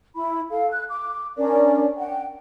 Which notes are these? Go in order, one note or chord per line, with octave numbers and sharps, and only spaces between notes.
E4 B5
A4 F5
F#6
D6
C#4 D4 A#4 D5
F#5 G5